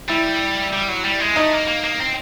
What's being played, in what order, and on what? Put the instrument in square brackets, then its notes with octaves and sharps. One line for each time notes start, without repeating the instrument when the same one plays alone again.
[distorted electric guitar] G3 [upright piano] E4
[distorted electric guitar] G3
F#3
G3
G#3
[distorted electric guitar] A3 [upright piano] D#4
[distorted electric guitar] A#3
A#3
A#3
C4